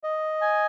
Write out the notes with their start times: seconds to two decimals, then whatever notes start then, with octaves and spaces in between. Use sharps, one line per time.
0.04 D#5
0.41 G#5